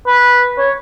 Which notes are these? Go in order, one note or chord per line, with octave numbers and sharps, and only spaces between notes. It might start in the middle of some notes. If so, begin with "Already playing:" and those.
B4
C#5